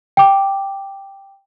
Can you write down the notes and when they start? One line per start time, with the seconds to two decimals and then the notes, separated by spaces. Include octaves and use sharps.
0.17 G5 D6